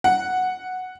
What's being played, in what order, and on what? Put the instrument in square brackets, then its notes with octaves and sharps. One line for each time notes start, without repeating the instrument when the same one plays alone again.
[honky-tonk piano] F#5